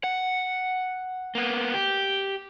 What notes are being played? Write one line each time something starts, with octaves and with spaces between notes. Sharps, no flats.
F#5
A#3 B3
G4